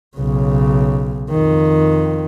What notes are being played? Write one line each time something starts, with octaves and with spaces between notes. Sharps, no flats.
B1 C#3
F2 D#3